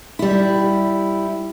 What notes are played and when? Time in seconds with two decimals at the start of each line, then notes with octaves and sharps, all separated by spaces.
0.19 G3 E4